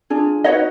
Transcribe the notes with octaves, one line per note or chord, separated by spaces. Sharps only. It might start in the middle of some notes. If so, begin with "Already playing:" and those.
D4 F4 G#4
D#4 F#4 B4 C#5 D#5